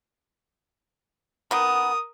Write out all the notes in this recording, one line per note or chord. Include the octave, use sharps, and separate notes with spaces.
D#3 B3 A#4 D#6